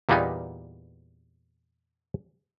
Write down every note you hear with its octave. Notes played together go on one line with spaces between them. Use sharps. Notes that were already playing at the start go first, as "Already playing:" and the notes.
E2 A#2 G3 A#3 B3 D#4